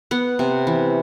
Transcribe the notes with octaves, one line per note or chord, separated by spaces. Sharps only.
B3 F#5
C3
E3